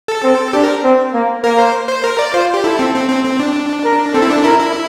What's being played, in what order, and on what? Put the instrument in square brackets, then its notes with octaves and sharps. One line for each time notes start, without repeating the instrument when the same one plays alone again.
[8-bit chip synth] A4
[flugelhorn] C4
[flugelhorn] D4 [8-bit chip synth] G4
[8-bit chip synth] A#4
[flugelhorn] C4
A#3
[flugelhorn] A#3 [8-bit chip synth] A#4
[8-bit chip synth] C5
C5
A#4
D5
[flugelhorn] F4 [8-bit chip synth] C5
[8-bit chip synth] G4
[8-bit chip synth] E4 [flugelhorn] A4
[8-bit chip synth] C4
C4
C4
C4
D4
[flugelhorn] A#4
[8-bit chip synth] C4 [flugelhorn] A4
[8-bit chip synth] E4
D4
[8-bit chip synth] E4 [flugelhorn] A#4
[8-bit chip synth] E4